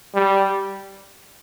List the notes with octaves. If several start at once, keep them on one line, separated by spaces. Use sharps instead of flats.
G3